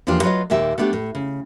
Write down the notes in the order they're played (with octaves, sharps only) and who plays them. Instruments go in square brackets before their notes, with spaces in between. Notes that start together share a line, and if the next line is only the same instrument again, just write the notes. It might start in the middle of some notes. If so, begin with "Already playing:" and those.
[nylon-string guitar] E2 F3 A#3 D4 F4 G4
F#3 F4 B4 C#5 D#5
D#2 A#2 D#3 G4 E5
A3 B3 D4 F4 G4
A2
C#3